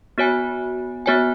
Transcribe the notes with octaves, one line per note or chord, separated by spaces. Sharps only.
B3 F#4 C#5 G#5
B3 F#4 C#5 G#5